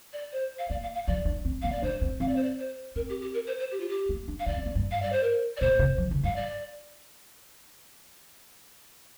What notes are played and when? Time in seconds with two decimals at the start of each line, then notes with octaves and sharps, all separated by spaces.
0.13 D5
0.32 C5
0.58 F5
0.70 A#3 D5
0.82 F5
0.95 F5
1.07 F3 D5
1.25 D4
1.45 C4
1.62 A#3 F5
1.72 D5
1.82 D4 C5
2.01 C4
2.20 C4 F5
2.28 D5
2.36 C5
2.43 D5
2.58 C5
2.95 C4 A#4
3.09 G4
3.21 G4
3.34 A#4
3.46 C5
3.59 C5
3.71 G4
3.80 F4
3.88 G4
4.09 A#3
4.28 D4
4.39 F5
4.47 D4 D5
4.57 C4
4.66 A#3
4.75 G2
4.91 F5
5.02 D5
5.12 C5
5.23 A#4
5.56 D5
5.60 A#2 C5
5.79 C3
5.98 F3
6.11 D3
6.23 G2 F5
6.36 D5